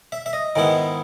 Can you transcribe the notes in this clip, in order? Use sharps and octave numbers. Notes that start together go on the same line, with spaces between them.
E5
E5
D#5
G#2 D#3 G#3 B3 E4